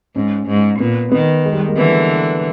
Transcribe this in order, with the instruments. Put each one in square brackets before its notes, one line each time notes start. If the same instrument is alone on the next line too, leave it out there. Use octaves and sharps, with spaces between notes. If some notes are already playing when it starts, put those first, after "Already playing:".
[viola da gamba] G#2 [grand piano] C#4
[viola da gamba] G#2
[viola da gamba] A#2 [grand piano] B3
[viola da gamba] D#3 [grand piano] B3
[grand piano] G#3
G3
G#3
A#3
[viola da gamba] D3 E3 [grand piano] B3